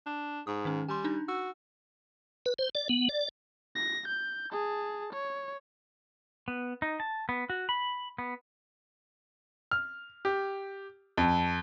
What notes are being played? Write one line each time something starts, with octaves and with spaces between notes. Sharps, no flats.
D4
G#2 D#6
D#3 C#4
G3 G#5 C6
D4 D#4
F#4 E6
B4
C5
D5
B3
D5
A#6
G6
G#4 A5
C#5
B3
D#4
A5
B3
F#4
B5
B3
F6
G4
F2